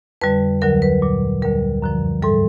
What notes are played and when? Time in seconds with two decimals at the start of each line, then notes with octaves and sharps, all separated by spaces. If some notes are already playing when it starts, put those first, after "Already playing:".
0.21 F2 D3 G3 B4
0.62 D2 D3 F#3 A#4
0.82 B4
1.02 A#2 F#3
1.42 D2 D3 G3 A#4
1.82 F#2 D3 F3
2.23 G#2 E3 G3 A4